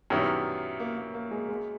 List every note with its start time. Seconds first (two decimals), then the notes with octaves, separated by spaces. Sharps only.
0.10 F#2 D#3 G3 B3 E4
0.80 A#3
0.97 A#3
1.14 A#3
1.31 G#3
1.49 G#3